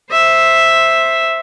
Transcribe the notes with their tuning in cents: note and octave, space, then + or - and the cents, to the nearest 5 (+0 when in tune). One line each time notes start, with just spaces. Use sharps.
C5 +10 E5 +0